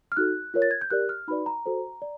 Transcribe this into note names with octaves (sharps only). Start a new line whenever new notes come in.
F6
D#4 F#4 A4 F#6
F4 A#4 C#5
A6
G#6
G6
G4 A#4 D5 F#6
F6
D#4 F#4 B4 D5 B5
A#5
F#4 A4 C5
D5